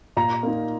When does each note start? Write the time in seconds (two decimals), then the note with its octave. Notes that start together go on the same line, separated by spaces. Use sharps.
0.17 A#2 A#5
0.43 A#3 D#4